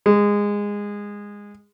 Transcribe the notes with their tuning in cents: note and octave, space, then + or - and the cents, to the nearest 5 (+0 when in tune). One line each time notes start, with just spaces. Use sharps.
G#3 -15